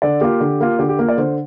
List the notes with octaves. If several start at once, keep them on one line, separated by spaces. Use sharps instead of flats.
D3 D5
A#3 F4 G4
D3
A#3 F4
D3 G4
G4
A#3 F4
D5
D3 C5